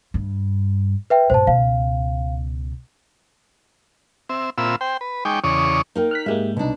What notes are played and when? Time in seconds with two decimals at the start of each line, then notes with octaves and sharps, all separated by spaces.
0.14 G2
1.10 B4 E5 G5
1.30 G2 A#2 C5 A5
1.47 C#2 B2 F5
4.29 C4 E5
4.58 A#2 C4 F4 E5 B5 E6
4.81 C5 G5
5.01 B4
5.25 G#3 D#4 G5 C#6 D6
5.44 E2 C#3 C#5 D5 C#6 D#6
5.96 A#3 D#4 A#4 G5
6.11 F6 F#6 B6
6.26 G#2 G#3 A#3 G4 E5
6.57 C2 B2 D4 D#4